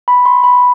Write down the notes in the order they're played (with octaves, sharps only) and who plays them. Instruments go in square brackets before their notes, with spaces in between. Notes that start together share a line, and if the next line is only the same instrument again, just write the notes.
[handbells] B5
C6
B5